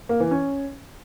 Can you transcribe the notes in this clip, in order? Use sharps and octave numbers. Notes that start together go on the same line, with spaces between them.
A#3
E3
C#4